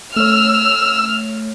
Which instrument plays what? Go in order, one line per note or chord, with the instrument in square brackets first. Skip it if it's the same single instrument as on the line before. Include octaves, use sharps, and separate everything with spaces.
[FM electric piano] A3 C#5 [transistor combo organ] E6 [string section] F6